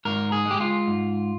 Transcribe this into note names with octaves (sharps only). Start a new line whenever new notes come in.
G#2 A#4
G#4
G#3
G4
F4
G#2